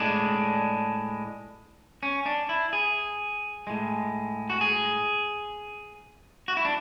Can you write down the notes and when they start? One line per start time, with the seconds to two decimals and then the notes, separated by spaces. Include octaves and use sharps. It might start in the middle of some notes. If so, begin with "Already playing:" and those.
Already playing: A2 G#3 D4
2.03 C#4
2.26 D4
2.49 E4
2.73 G#4
3.67 A2 G#3
4.50 F#4
4.61 G#4
6.48 F#4
6.57 E4
6.65 D4